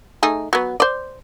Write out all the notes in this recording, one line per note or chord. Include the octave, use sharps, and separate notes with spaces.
A3 D#4 G#4
F#3 B3
C5 D5